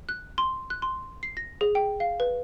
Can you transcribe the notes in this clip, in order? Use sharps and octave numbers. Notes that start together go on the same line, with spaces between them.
F#6
C6
F#6
C6
C7
A#6
G#4
G5
F5
B4